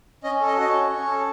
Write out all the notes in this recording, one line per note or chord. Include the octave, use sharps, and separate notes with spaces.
C#4 D#5
A4
D#5
F#4 D#5
C#5
C#4
C#4
A4